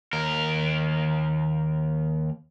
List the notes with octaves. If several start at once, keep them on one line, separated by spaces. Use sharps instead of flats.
D#2 A#4